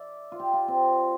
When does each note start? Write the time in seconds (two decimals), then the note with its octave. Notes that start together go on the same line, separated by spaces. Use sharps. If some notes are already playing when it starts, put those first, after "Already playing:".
Already playing: D5 E5
0.32 F4
0.40 G4
0.54 F4
0.68 C4